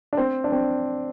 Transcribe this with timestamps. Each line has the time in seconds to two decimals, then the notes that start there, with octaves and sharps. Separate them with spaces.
0.13 D4
0.17 C4
0.44 D4
0.52 C4